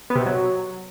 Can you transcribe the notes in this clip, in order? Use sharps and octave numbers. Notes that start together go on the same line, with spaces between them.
B3
C3
B2
F#3